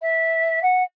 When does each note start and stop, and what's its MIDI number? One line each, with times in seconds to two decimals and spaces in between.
0.02 0.60 76
0.63 0.83 78